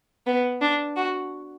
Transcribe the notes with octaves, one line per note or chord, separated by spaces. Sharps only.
B3
D4
F#4